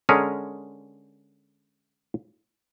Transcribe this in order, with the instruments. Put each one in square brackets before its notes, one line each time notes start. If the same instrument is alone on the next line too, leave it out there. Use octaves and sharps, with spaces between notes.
[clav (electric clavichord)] D3 G#3 C#4 G#4 A#4